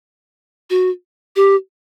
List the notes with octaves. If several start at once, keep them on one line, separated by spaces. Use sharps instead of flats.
F#4
G4